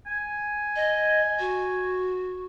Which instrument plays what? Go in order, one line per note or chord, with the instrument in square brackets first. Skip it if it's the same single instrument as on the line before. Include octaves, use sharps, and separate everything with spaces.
[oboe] G#5
[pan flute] D#5
F#4